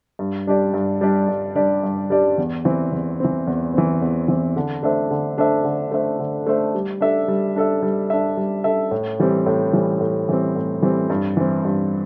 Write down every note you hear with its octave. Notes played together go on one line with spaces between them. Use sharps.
G2
G3 D4 G4 D5
G2
G3 D4 G4 D5
G2
G3 D4 G4 D5
G2
G3 D4 G4 D5
E2
E3 C4
E2
E3 C4
E2
E3 C4
E2
E3 C4
D3
A3 D4 C5 E5
D3
A3 D4 C5 E5
D3
A3 D4 C5 E5
D3
A3 D4 C5 E5
G3
D4 A4 E5
G3
D4 A4 E5
G3
D4 A4 E5
G3
D4 A4 E5
A2
E3 G3 C4
A2
E3 G3 C4
A2
E3 G3 C4
A2
E3 G3 C4
G2
E3 C4
G2